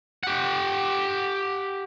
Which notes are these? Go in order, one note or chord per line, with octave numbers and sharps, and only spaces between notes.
G4 F#5